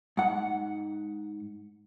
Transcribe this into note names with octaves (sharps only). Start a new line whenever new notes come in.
G#2 F#5